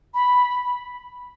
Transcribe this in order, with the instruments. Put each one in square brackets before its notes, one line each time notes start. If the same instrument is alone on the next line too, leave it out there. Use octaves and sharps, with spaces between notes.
[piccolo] B5